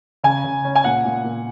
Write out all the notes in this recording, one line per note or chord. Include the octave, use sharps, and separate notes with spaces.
C#3 G#5
C#3
C#4
G#5
A#2 F#5
A#2
A#2